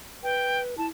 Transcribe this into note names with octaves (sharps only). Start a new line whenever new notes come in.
B4 G5
E4 A5